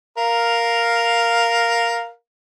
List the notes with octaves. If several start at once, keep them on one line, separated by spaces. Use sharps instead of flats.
A#4 F5